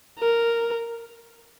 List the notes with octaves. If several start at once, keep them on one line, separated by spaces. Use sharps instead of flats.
A#4